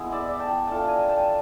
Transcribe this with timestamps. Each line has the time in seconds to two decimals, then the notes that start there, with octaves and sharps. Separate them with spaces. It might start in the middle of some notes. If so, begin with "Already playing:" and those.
Already playing: G#3 B3 E4
0.12 D5 E5
0.39 G5 A5
0.67 A3 D4 F4 G5 A5
0.88 G#5 A#5
1.09 G5 A5